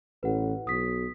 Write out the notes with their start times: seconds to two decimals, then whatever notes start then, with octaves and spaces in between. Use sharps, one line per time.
0.23 A1 B4 F#5
0.67 B1 D#6 B6